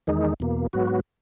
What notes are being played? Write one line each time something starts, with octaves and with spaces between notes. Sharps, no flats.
E2 D#3 G#3 D#4
E2 B2 A#3
G#2 F#3 B3 F#4